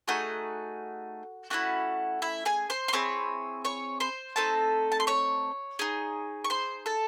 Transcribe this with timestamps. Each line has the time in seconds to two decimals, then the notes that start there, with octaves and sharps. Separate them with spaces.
0.08 A3 D#4 F#4 G#4 F#5
1.50 A3 C#4 E4 F#4 F#5
2.22 E4 E5
2.45 G#4 G#5
2.70 C5 C6
2.88 C6
2.93 C4 E4 G#4 C#5 C#6
3.65 C#5 C#6
4.00 C5 C6
4.36 A3 C4 D#4 A4 A5
4.92 A5
5.00 C6
5.07 C#5 C#6
5.79 D#4 G#4
6.45 C#6
6.50 C5 C6
6.86 A4 A5